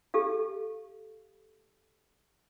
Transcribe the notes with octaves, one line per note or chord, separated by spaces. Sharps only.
G4 A4 F5